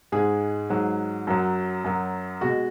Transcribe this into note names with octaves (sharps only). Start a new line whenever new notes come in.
G#2 G#3 G#4
G#2 F#3
F#2 F#3
F#2 F#3
B2 G#3 F#4